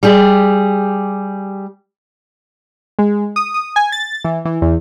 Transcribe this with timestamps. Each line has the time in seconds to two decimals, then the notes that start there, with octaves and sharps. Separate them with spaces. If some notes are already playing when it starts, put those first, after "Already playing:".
0.03 G3 G4 G#4
2.99 G#3
3.36 D#6
3.54 D#6
3.76 G#5
3.92 A6
4.25 E3
4.45 E3
4.62 E2